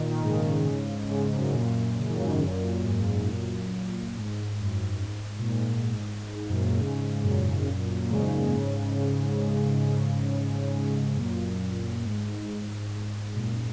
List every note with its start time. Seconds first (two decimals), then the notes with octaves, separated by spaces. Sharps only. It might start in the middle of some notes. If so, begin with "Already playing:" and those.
Already playing: A#2 D#3
0.11 D#3
0.23 G#2 C#3
1.10 G#2
1.36 F#2
1.45 G#2
1.55 F#2 A#2
1.98 C#3
2.09 D#3
2.20 G#2 C#3
2.41 F#2 A#2
2.85 G#2
2.94 A#2
3.02 G#2
3.29 F#2 A#2
4.17 G#2
4.61 F#2
5.04 G#2
5.39 A#2
5.48 G#2
6.36 G#2
6.49 F#2 A#2
6.64 F#2 A#2
6.79 G#2 C#3
7.23 F#2 A#2
8.03 A#2
8.10 G#2 C#3
9.85 G#2 C#3
11.17 F#2 A#2
12.04 G#2
12.92 G#2
13.35 F#2 A#2